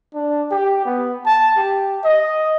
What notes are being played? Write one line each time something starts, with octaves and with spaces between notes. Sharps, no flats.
D4
G4
B3
A5
G4
D#5